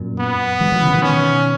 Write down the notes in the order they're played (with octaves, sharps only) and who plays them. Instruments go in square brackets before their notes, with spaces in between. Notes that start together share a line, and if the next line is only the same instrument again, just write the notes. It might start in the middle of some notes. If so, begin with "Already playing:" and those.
Already playing: [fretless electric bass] F#2 A#2
[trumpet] B3
[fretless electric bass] E3 G#3
D#3 F#3
C#3 E3
B2 D#3
[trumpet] C#4